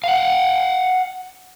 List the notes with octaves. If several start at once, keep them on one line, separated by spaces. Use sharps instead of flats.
F5 F#5